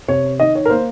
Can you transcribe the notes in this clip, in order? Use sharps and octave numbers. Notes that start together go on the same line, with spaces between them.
C3 C#5
D#3 D#5
C#5
A#4
A#3 C5